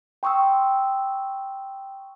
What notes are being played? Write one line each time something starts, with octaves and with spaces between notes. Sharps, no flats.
G5 C6 C#6 D#6 E6